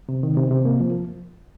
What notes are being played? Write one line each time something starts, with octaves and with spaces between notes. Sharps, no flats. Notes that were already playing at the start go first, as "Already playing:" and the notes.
C3
D#3
C3
C3
A#3
F3